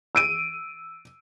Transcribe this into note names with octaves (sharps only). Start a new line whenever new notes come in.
E6 D7 D#7